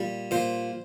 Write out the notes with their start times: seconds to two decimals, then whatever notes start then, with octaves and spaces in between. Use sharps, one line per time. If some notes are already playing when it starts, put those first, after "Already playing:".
Already playing: A#2 G3
0.31 A#2 C5